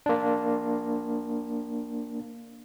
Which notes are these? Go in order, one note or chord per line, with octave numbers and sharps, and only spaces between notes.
A#3 D4